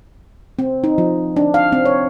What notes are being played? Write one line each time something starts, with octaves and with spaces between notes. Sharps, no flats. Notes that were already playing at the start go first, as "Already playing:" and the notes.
C4
D#4
F3
D4
F5
C4
C#5